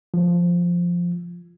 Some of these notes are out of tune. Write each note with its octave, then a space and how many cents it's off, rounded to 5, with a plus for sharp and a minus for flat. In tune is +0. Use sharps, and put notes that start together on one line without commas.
F3 +0